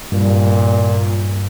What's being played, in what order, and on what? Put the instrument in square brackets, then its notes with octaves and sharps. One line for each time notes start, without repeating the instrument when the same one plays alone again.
[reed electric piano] G2 [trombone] A#2